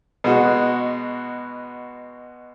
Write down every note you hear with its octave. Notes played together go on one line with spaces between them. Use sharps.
B2 G#3 F#4